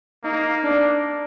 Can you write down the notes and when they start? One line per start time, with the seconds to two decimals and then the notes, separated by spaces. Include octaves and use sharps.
0.24 A#3 D#4
0.64 D4